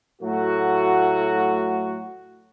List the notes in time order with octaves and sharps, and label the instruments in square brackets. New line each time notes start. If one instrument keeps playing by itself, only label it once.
[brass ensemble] A2 F#3 A3 F#4